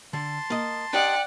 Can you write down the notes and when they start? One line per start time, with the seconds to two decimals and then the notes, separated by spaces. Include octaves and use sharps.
0.13 D3 A5 C6
0.50 A#3 D#5
0.93 D4 G4 D5 D#5 F#5 G5